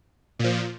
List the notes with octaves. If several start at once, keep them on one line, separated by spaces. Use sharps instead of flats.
A#2 F3